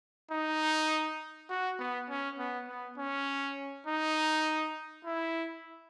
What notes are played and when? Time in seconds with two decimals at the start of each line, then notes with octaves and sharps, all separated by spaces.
0.31 D#4
1.50 F#4
1.79 B3
2.09 C#4
2.39 B3
2.68 B3
2.98 C#4
3.87 D#4
5.05 E4